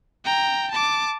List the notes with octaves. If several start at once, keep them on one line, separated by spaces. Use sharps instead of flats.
G5 A#5
A5 D6